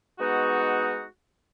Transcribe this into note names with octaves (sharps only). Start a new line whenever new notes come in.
G#3 B3 D#4 F#4